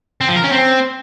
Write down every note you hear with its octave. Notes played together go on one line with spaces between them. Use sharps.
C4
F3
A#4
C#4
C4